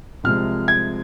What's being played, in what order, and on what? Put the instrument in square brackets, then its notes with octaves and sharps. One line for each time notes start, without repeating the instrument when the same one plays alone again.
[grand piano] C2 C3 F3 G#3 F6
G#6